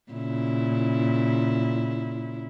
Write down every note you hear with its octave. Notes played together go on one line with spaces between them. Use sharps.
A#2 C#3 E4